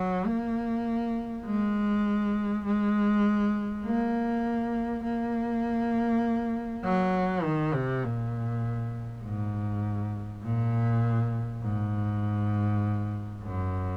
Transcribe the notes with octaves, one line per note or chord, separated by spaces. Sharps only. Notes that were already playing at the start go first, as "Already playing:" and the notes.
Already playing: F#3
A#3
G#3
G#3
A#3
A#3
F#3
D#3
C3
A#2
G#2
A#2
G#2
F#2